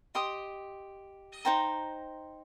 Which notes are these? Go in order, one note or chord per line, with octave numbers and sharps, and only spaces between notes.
G4 D#5 C6 D#6
D#4 C5 G5 A#5